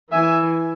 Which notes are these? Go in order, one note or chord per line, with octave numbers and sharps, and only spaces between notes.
E3 E5 G#5